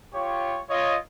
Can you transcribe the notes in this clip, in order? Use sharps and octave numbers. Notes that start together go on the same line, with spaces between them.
F4 G4 C#5
F4 C#5 D#5